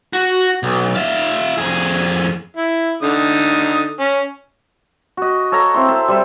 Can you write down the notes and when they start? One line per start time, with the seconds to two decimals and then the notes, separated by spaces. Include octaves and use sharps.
0.13 F#4
0.63 B1
0.95 F4 E5
1.58 F2 G#4
2.57 E4
3.03 D3 D#4 D#6
4.00 C#4
5.17 F#4 D#5
5.52 A4 C#5 F5 A#5
5.74 C4 E4 C6
5.88 A4 E5 F5
6.08 G3 C5 E5